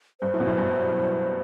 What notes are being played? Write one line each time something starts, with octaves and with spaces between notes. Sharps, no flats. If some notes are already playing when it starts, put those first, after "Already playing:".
G2 C5
F#2 A2
B2
F#2 A2
G2